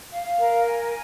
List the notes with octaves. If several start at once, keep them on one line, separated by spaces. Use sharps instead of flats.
F5
A#4
G#5